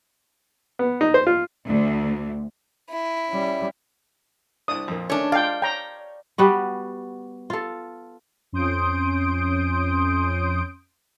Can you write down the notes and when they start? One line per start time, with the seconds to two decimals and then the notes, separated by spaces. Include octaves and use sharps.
0.79 B3
1.01 D#4
1.14 C5
1.27 F4
1.67 D2
2.90 E4
3.29 G3 C#4
4.68 C2 D4 D#6
4.88 F2 A#2
5.10 D#3 A3 C#4 D4 C#5
5.32 G#3 F4 D5 F5 G5
5.62 C#5 G5 A#5
6.38 G3 B3 F#4
7.50 F4 A4
8.52 F2 C#4 C6 D#6 G6 D7